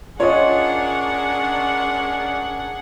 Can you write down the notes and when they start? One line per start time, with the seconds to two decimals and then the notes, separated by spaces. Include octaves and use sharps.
0.20 C#4 D4 F4 G#4 A#4 C#5 D#5 F#5